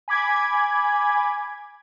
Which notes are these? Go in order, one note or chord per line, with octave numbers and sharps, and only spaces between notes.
G#5 B5 D6 G#6